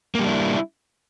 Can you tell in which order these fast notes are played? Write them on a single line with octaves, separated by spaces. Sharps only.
A#3 G3 D4 E4